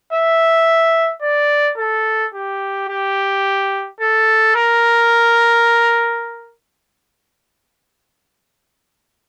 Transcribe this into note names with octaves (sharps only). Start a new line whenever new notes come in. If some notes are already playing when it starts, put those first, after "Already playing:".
E5
D5
A4
G4
G4
A4
A#4